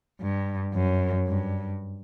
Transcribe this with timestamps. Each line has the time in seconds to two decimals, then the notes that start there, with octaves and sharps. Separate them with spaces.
0.21 G2
0.74 F#2
1.28 G2